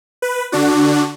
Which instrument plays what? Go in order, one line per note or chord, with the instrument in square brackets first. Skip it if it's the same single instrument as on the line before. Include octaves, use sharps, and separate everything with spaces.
[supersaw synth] B4
D3 D4 F#4